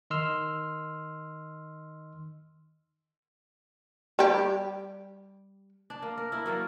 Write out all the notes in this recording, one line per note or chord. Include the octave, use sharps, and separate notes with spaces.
D#3 D#5 C6 E6 F6
G3 G4
D4
A#3
A#4
E4 A#4
F#3 A#3 A#4 D5